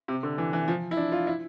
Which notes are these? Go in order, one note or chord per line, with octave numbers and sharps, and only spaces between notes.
C3
D3
E3
E3
F3
E4
D4
F4
E4